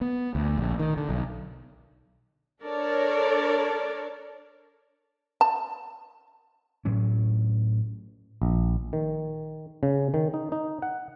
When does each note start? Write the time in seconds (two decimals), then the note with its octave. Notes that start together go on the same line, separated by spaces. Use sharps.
0.01 B3
0.35 D2
0.58 A#1
0.79 D#3
0.97 D3
1.09 B1
2.63 D4 A4 A#4 C#5 D5 A5
5.41 A5
6.85 A2 F#3 C#4
8.42 A#1
8.93 D#3
9.83 C#3
10.14 D#3
10.34 D#4
10.52 D#4
10.82 F#5